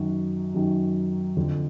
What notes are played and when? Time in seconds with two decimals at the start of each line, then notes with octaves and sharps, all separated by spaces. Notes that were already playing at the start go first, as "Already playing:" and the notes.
Already playing: F#2 D#3 F#4
0.55 F#2 D#3
1.37 F2 D3